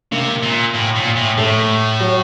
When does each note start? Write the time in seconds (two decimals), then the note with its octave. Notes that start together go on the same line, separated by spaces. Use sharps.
0.12 C3 A#3
0.43 A#2
0.75 A2
0.96 A#2
1.16 A2
1.38 A2 A3
2.00 F#3